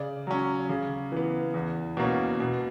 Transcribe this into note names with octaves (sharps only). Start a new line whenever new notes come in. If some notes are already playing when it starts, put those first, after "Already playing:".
Already playing: C#3 D5
F#3 C#4
C#3
E3 B3
E2
B2 A#3 C#4
B2